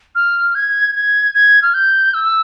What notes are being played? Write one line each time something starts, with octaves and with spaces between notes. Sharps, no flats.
F6
G#6
G#6
G#6
F6
G6
E6